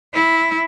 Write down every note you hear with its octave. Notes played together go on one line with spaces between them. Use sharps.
E4